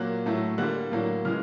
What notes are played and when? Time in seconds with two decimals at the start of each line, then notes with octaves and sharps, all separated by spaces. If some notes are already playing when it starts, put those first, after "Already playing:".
Already playing: A#2 F#3 A#3 F#6
0.26 A2 F#3 A3
0.58 D3 G3 A#3 F#6
0.91 A2 F#3 A#3
1.25 C#3 E3 G#3 F6